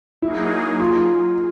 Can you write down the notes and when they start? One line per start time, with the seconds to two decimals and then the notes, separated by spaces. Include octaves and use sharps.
0.22 F#3 A#3 D#4 E4 G#4
0.80 F4